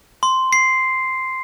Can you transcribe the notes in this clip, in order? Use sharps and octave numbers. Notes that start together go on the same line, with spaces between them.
C6
C7